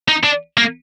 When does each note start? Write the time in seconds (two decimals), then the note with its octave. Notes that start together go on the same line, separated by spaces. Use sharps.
0.08 D#4
0.24 D4
0.58 A#3